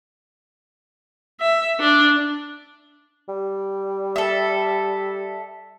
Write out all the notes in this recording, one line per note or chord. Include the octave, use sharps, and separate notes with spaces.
E5
D4
G3
A4 E5